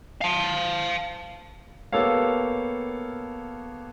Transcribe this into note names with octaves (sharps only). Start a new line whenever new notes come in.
F5 A5
A#3 B3 G4 A4 C#5 F5